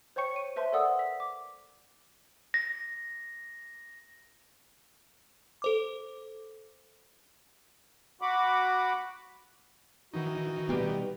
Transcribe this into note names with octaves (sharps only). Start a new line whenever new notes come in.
C5 C#5 G5 C#6 C#7
D#7
B4 C5 E5 A5 C6
A4 A#4 D5 F#5 D#6 E6
B6
D6
A#6
A4 C5 D6
F#4 F#5 B5 D6
D#3 E3 D#4 F#4
B2 G3 B3 G4